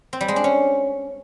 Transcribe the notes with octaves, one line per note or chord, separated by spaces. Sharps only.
C4
G3
G#3
D4
C#4